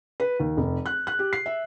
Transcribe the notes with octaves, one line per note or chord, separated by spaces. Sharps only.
B4
D#2
F1
F#6
F#6
G4
C7
E5